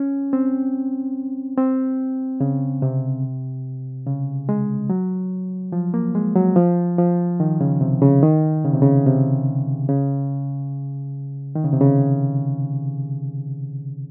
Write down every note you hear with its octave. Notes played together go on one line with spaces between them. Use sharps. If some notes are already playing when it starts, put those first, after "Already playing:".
Already playing: C#4
C4
C4
C#3
C3
C#3
G#3
F#3
F3
A#3
G#3
F#3
F3
F3
D#3
C#3
C3
C#3
D#3
C#3
C3
C#3
C3
C#3
D#3
C#3
C3
C#3